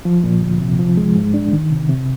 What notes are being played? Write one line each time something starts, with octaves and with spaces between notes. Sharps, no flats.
F3
A#2
D2
C3
F3
G#3
G#2
D4
D#3
C3
C3